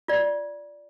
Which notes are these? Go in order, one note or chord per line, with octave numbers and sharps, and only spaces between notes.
F4 D5